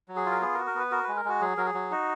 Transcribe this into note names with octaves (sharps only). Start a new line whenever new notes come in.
F#3
G#4
F4
A#4
B3 G#4
A#4
F#4
A#4
B3 B4
F#4 A#4
G#3 B4
A#4
G#3 F#4
F#3 G#4
F#3 A#4
G#4
F#3
D#4 F#4